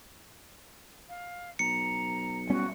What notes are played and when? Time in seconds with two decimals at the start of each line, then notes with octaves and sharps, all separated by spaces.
1.09 F5
1.59 B1 A#5 C#7
2.50 G3 B3 C#4 F#4